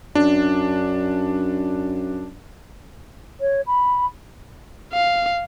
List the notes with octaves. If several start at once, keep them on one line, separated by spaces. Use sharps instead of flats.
F#2 D4
C#5
B5
F5